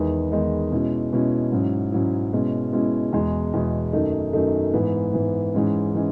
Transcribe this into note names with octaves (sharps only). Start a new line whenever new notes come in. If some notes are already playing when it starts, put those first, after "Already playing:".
Already playing: E2 D#3 G#3 B3 D#4
E2 D#3 G#3 B3 D#4
B2 G#3 C#4 E4
B2 G#3 C#4 E4
G#2 F#3 C#4 E4
G#2 F#3 C#4 E4
B2 G#3 C#4 E4
B2 G#3 C#4 E4
E2 B2 G#3
E2 B2 G#3
F#2 D#3 A3 D#4
F#2 D#3 A3 D#4
G#2 E3 B3
G#2 E3 B3
G#2 E3 G#3 C#4
E3 G#3 C#4